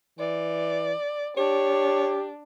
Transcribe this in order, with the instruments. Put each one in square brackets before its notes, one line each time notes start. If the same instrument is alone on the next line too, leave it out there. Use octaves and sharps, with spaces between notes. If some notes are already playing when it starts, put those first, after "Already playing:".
[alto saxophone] E3 [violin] D5
[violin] D4 [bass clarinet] G4 [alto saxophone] C#5